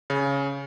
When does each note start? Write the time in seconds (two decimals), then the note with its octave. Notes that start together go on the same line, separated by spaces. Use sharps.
0.10 C#3